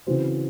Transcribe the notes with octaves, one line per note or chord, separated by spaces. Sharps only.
C#3 E3 C4 F#4 C5